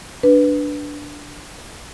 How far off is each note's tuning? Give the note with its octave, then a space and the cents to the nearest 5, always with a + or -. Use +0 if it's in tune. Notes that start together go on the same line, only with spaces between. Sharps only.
D4 +0 B4 +0